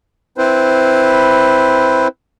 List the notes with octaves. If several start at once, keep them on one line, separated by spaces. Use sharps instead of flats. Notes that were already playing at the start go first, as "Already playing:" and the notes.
C4 E4 B4 C5